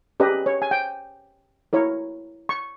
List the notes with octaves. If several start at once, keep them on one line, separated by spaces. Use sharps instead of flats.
C#4 G4 B4 D#5
C#5
G#5
G5
E4 A#4 C#5
C#6